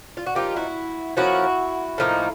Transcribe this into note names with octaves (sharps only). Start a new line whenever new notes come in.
F4
F#4
F3 A#3 D#4 F4 G4
E4 F#4
F3 A#3 C#4 E4 F#4
A2 F3 A#3 D#4